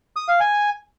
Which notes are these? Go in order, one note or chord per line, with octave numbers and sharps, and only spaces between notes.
D#6
F5
G#5